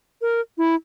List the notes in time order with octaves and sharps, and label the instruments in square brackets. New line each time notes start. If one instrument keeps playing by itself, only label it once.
[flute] A#4
E4